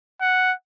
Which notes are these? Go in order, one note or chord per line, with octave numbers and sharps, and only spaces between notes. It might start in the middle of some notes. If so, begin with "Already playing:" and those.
F#5